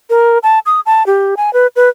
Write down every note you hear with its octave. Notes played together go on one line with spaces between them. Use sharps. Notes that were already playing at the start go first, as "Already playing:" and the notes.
A#4
A5
D#6
A5
G4
G#5
B4
B4